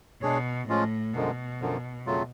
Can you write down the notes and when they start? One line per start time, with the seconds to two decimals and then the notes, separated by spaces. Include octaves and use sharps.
0.22 B2 G#3 D4 G#4 C#5
0.68 A2 F3 G#3 C#4 F4
1.14 F#2 B2 D3 F3 G#3
1.61 F#2 D3 F3
2.06 F2 C#3 F#3 A3 F4